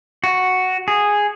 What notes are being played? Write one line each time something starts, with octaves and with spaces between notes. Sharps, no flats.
F#4
G#4